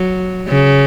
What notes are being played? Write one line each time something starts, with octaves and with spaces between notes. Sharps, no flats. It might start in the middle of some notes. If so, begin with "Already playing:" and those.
Already playing: F#3
C#3